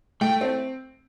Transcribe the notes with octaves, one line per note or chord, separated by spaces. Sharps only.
A3 G5
C4